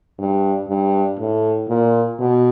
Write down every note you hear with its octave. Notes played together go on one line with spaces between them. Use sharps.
G2
G2
A2
A#2
B2